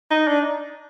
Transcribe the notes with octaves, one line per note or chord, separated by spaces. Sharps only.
D#4
D4